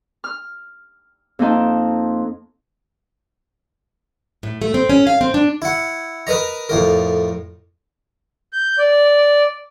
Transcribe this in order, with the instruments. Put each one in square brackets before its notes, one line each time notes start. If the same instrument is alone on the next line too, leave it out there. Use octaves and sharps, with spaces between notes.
[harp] F6
F2 A#3 D#4 A5
[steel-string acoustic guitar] A2
A3
C4
C#4
F5
C4
D4
[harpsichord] E4 F#5
A#4 B4 D#5 A#5
F2 A2 A#4
[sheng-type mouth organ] G6
D5